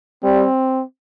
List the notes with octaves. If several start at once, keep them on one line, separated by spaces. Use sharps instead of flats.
G3 C4